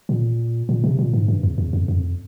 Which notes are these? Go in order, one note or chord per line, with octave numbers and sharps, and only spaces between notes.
A#2
A#2
C3
A#2
G#2
G2
E2
E2
F2
F2